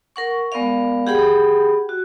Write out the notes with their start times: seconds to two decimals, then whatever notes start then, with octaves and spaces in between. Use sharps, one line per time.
0.16 A#4 F#5 C#6
0.52 G#3 B3 A#4 D5 F5
1.07 G4 G#4 F#5 G5 B5
1.89 F#4